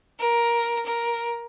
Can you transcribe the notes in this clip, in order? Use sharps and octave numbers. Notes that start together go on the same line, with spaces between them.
A#4
A#4